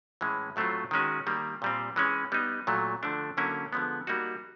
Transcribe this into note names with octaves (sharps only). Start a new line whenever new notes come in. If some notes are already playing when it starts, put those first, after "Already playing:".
A2 E3 G#3 C#4
A2 F#3 A3 C4 F4
D#3 G#3 C#4 F#4
D#3 G3 A#3
A#2 G3 C4
E3 G#3 C#4
G3 B3 D#4
A#2 F#3 A3
D3 F3 A3 D4
D3 F#3 A#3 C#4 E4
D3 F3 G#3 B3
G3 A#3 D#4 F#4